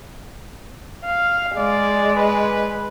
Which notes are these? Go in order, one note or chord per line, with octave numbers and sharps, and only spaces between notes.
F5
G#3 D5
B4